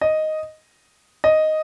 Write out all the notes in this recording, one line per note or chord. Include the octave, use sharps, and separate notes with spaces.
D#5
D#5